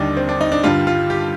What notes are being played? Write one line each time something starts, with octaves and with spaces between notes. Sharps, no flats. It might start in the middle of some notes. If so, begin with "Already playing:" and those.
Already playing: D#2 D3 G3 D4 D#4
C4
D4
D#4
D4
G2 D3 G3 F4
F4
G4